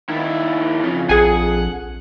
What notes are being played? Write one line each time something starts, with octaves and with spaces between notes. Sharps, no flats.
D#2 D#3 E4
F2 C#3
A#1 G#4 F#5 G#5